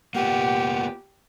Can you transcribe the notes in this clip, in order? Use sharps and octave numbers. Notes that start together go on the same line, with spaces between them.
A#3 B3 F4 G4 F#5